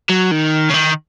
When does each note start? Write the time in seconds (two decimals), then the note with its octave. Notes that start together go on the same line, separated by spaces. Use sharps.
0.09 F#3
0.31 D#3
0.70 C#3
0.74 D#3